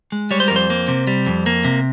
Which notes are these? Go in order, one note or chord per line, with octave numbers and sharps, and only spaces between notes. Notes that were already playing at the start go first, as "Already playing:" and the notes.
G#3
G3 C#5
C5
F2 A#4
C5
A#3
C3
G3
F2
A#3
C3